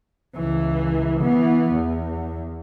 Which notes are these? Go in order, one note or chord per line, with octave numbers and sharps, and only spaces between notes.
C#2 E3
E3 B3
E2